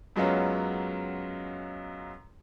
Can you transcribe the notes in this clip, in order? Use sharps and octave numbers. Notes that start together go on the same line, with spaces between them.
F#2 F#3 G#3 B3 C#4 F4